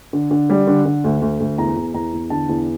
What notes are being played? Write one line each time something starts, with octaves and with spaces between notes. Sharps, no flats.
D3
D3
G3
D3
D3
D2
D2
D2
E2 A#5
E2
E2 A#5
E2
D3 A5
E2